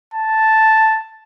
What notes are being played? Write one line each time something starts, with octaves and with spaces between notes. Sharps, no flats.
A5